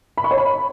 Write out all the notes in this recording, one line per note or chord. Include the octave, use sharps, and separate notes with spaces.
B5
C#6
C#5
B5